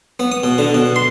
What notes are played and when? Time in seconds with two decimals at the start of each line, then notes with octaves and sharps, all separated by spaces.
0.20 B3
0.32 D#6
0.43 B2
0.58 D3
0.74 B2
0.96 C6